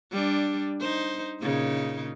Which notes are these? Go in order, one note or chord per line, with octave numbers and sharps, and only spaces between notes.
G3 D4
D#4 C5
A#2 C#3 D#4